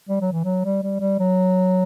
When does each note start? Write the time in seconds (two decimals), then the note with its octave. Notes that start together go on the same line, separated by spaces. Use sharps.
0.09 G3
0.21 F#3
0.32 E3
0.44 F#3
0.65 G3
0.83 G3
1.01 G3
1.19 F#3